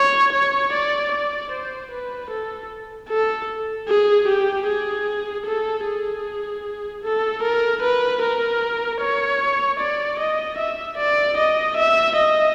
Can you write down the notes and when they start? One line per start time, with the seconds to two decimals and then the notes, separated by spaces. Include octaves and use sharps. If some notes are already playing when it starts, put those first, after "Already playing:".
Already playing: C#5
0.33 C#5
0.73 D5
1.12 D5
1.52 C5
1.91 B4
2.30 A4
3.09 A4
3.88 G#4
4.28 G4
4.67 G#4
5.46 A4
5.86 G#4
7.04 A4
7.43 A#4
7.82 B4
8.22 A#4
9.01 C#5
9.79 D5
10.19 D#5
10.58 E5
10.98 D5
11.37 D#5
11.77 E5
12.16 D#5